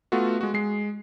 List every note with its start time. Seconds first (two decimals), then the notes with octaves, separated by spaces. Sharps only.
0.12 A3 B3 F4 F#4
0.41 G#3 F#4
0.54 G#3 C7